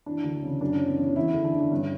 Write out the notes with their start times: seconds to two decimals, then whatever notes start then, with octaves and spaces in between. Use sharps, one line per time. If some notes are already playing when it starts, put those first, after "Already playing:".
0.06 E3 D4
0.24 D2
0.43 C#3
0.61 F#2 D4
0.74 C#4
0.80 E3
0.88 B3
0.97 E3 C#4
1.16 E2 E4
1.34 D3
1.44 D4
1.53 D3
1.60 D4
1.71 G2 C#4